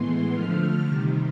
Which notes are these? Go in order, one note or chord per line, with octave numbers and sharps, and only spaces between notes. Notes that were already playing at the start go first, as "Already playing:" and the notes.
Already playing: A2 E3 G#3 B3 C6
D3 F3 A3 F6
C3 D#3 G3